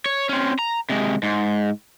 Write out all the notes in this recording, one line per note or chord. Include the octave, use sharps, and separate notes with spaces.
C#5
C4 C#4
A#5
C3 G#3
G#2